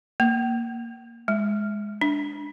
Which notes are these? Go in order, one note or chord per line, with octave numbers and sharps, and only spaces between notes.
A#3
G#3
D4